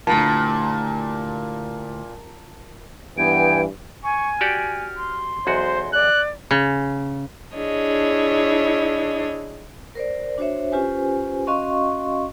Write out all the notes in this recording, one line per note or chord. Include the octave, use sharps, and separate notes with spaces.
D2 A#2 E4 G4 A5
G2 E3 B3 G5 G#5 D7
G#5 C#6
F#4 G4 D5 F6
C6
B1 E2 F#4 C5
D5 F#6
C#3
D4 E4 G#4 C#5 D#5
A#4 C5 D5
D4 F#4 C5 C#5 E5
C#4 F4 G4 B4 C5 G#5
C#4 F#4 D#5 F5 C6 C#6